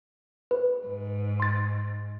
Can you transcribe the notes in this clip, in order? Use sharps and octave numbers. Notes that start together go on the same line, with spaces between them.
B4
G#2
C6 A6